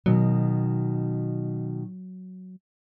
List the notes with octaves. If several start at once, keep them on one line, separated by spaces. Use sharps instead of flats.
B2 D#3 F#3